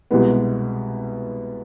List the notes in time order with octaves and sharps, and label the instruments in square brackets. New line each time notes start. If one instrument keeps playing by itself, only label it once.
[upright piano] C2 B2 G#3 B3